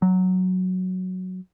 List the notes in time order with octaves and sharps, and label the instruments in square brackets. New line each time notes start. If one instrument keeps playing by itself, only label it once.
[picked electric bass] F#3